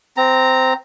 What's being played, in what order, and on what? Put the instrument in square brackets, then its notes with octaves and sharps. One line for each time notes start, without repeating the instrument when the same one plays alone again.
[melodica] C4 A#5